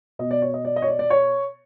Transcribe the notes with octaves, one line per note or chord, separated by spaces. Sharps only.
B2 D#5
D5
C#5
D#5
D5
D#5
C#5
D5
D5
C#5